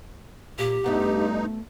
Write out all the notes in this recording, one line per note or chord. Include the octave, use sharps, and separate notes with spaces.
A#2 G4
G2 A3 B3 D#4 F#4